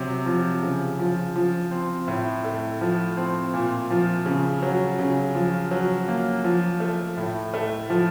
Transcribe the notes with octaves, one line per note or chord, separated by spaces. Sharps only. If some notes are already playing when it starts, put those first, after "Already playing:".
Already playing: C3 F#3
F3
C#3
F3
F3
C4
A2
A3
F3
C4
A#2
F3
C#3
F#3
C#3
F3
F#3
A#3
F3
A3
A2
A3
F3